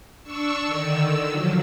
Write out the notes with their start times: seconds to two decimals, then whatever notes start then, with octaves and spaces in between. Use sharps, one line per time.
0.23 D4 C#6 E6
0.66 D3 D#3 E6
1.28 F3 F#3